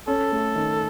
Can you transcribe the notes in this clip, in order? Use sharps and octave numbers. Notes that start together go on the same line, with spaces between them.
C#4 A4
A3
D#3